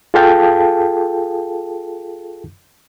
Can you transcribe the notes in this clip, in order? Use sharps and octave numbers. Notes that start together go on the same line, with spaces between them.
F4 G#4 A4 F5 G5 A5